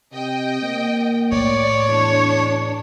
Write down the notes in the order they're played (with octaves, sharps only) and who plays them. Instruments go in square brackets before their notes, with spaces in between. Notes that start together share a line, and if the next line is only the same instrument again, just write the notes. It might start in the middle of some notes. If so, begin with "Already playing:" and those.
[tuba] C3 [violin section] D#5 G5
[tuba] A#3
[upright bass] A2 [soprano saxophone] C#5 [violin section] D5
[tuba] E2 [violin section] D4